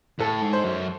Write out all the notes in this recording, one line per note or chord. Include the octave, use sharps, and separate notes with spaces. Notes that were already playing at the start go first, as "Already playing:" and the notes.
A2 A4
G#2
C5
F#2